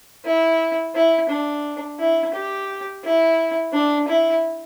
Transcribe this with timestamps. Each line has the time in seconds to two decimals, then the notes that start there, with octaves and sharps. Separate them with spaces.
0.25 E4
0.95 E4
1.29 D4
1.99 E4
2.34 G4
3.04 E4
3.73 D4
4.08 E4